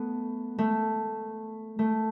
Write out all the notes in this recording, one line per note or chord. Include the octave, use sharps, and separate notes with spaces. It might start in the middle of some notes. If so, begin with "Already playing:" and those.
Already playing: A3 B3
A3
A3